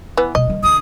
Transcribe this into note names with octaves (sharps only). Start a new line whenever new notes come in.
E3 B3
B2 G#3 D#5
D#3 G3
D2 D#6